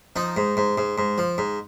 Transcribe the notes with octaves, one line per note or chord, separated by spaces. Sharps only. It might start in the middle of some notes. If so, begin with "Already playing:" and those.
F3 D#4
G#2
G#2
G#2
G#2
F3
G#2